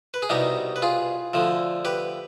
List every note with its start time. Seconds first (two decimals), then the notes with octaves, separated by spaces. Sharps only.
0.14 B4
0.22 G#4
0.29 C2 B2 G3 D#4 G4
0.76 B4
0.82 F4 G#4
1.34 D2 D3 F3
1.85 G4 B4